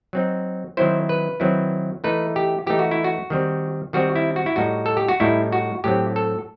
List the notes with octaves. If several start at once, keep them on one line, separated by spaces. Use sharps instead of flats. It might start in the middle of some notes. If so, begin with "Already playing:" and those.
F#3 C4 D#4
D#3 F#3 C4 E4 C5
B4
D#3 F#3 C4 E4
E3 A3 D#4 B4
G4
E3 A3 D#4 G4
F#4
E4
F#4
D#3 G3 C4
D#3 G3 C4 F#4
E4
F#4
E4
A2 G3 D#4 F#4
A4
G4
F#4
A2 G3 D#4 E4
F#4
A2 F#3 C4 G4
A4